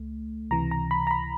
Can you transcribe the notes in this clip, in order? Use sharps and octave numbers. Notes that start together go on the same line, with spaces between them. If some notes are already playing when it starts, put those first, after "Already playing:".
Already playing: C#2 A3
C#2 C3 E3 A#5
A#5
B5
A#5
B5